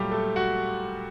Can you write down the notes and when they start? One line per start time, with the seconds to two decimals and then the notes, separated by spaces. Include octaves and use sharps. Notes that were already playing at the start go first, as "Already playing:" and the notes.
Already playing: A#2 F#3 G3 A3 G4
0.11 A3 A4
0.36 F#4 F#5